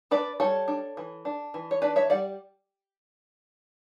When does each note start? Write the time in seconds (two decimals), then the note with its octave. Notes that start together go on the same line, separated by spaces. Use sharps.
0.11 D4 B4 D5
0.40 G3 A4 C#5
0.68 D4
0.97 E3
1.25 D4
1.54 E3
1.71 C#5
1.82 D4 B4 D5
1.96 C#5 E5
2.10 G3 D5 F#5